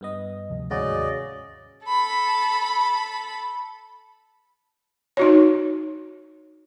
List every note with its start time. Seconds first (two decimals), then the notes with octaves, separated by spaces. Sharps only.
0.01 G2 B3 D#5
0.50 D2 C3 F3
0.71 D#2 G#2 C#3 F#4 D5 D#5
1.86 A4 B5
5.17 D#4 F#4 C#5